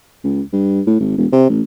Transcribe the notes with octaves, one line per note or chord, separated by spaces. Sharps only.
C#2
G2
A2
G#1
E1
C3
A1